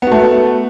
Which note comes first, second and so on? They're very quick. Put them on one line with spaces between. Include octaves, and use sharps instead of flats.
B3 F#4 A3